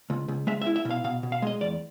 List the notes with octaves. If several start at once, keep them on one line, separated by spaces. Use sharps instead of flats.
C#2
C#2
G#3 E5
E5
E4
E5
B2
F5
B2 F5
B2
F5
G#3 D#5
E2 D5